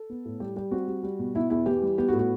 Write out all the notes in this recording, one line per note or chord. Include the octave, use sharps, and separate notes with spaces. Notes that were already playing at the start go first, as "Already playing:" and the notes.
Already playing: A4
B3
A2
G3 G4
G3 G4
C4 F#4
G3
G3
B2
B2 E4
E2 E4
E3 G4
G3
B3 G4
F#4
A2
F#4